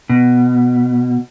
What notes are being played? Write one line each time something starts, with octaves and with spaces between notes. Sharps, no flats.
B2